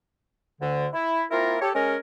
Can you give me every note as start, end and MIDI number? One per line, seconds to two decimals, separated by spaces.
0.61 0.87 38
0.61 0.87 50
0.93 1.24 64
1.31 1.57 58
1.31 1.57 60
1.31 1.57 64
1.31 1.57 65
1.31 1.57 70
1.61 1.70 67
1.61 1.70 69
1.61 1.70 73
1.75 1.97 56
1.75 1.97 61
1.75 1.97 70